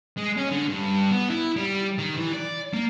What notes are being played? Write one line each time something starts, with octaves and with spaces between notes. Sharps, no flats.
G#3
C#4
D3
G2
B3
E4
G3
D#3
E3
D5
A#3